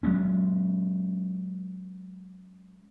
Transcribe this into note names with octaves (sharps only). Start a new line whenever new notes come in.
F#3 G#3 B3 C#4